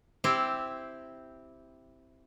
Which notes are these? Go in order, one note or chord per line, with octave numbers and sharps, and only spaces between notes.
C4 E4 G4